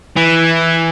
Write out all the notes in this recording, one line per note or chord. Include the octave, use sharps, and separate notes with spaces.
E3